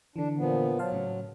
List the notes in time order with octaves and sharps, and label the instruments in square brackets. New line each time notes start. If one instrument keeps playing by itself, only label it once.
[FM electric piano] D3 E3 [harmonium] D4
[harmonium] A#2 F3 B3
[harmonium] F#3 [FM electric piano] C5 F5 A5
[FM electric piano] A2 C#3